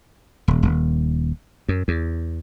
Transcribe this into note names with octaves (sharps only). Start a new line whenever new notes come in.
D#1
D#1
F#2
E2